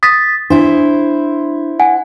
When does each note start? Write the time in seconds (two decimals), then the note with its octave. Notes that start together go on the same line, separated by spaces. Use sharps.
0.03 D#6 A6 B6
0.50 D4 E4 C5
1.80 F#5 G#5